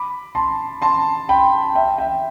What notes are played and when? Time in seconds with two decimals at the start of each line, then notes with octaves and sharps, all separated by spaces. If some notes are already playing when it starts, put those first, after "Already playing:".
Already playing: B5 D6
0.35 A5 C6
0.82 A5 C6
1.29 G5 B5
1.75 E5 G5
1.98 E5 G5